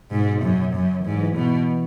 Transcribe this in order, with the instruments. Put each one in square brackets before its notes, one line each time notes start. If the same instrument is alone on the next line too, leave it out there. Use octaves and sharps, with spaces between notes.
[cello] G#2 [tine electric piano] B2
[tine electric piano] B2
[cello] F#2 [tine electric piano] C#3
[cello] F#2
[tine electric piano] E3
[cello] G#2 [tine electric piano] F#3
[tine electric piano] E3
[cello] B2 [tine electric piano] E3